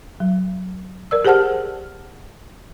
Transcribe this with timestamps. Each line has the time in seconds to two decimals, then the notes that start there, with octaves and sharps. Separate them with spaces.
0.20 F#3
1.11 A#4 D5 E6
1.25 G4 G#4 C5 F#5 A5 F6